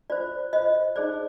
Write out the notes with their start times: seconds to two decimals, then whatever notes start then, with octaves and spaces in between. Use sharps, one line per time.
0.10 F4 C5 D5
0.53 F4 C5 D#5
0.96 D#4 G#4 C5 D5